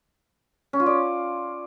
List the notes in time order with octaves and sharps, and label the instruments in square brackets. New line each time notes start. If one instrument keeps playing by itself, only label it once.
[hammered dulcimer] C#4
F4
D5